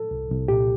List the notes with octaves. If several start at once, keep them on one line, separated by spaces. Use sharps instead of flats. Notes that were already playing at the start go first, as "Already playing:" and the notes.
Already playing: A4
C2
C2
A#2 G4